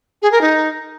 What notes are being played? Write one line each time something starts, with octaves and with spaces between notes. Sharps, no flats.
G#4
A#4
D#4